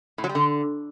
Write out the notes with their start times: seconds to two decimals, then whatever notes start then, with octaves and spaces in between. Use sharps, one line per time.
0.18 A2
0.24 F#3
0.29 G3
0.35 D3